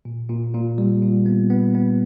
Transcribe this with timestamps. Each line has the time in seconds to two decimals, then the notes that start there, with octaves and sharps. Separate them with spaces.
0.05 A#2
0.30 A#2
0.54 A#2
0.78 G3
1.02 A#2
1.26 B3
1.50 B3
1.75 B3